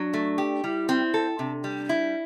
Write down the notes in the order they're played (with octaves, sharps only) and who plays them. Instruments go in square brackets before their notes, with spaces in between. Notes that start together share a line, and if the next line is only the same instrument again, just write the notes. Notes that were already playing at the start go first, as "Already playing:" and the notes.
Already playing: [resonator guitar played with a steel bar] F#3 [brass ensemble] D4
[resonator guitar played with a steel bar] A3
G4
[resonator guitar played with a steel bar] G3 [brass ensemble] E4
[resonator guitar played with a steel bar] C4
A4
[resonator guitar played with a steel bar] C3 [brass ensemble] D4
[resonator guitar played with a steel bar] G3
E4